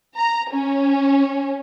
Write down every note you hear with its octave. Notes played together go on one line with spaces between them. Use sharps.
A#5
C#4